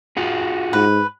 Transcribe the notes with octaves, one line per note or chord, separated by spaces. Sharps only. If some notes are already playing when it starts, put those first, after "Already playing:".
F4 F#4 G#4
G#2 B4